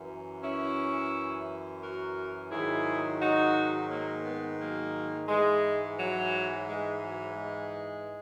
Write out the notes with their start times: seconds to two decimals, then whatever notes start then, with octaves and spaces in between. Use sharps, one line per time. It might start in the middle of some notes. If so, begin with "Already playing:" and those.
Already playing: F#2 E3
0.42 C#4 E4
1.81 F#4 A#4
2.50 G#2 D#3 F#3 E4 G#4
3.20 D#4 F#4
3.89 F#3 A#3
4.24 G#3 B3
4.59 F#3 A#3
5.28 G#2 E3 G#3
5.97 F#3
6.67 G#3
7.01 F#3
7.36 G#3